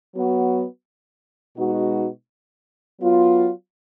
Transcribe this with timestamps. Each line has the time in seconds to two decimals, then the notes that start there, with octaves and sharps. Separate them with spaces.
0.14 F#3 B3 F#4
1.57 B2 G#3 D#4 F#4
3.00 F#3 B3 F4